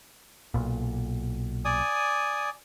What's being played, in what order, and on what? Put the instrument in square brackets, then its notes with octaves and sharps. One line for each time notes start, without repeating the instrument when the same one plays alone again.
[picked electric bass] B1 A#2
[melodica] D5 G#5 D#6